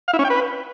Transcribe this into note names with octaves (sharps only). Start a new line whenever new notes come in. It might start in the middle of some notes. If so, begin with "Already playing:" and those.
F5
E4
C#4
G5
B4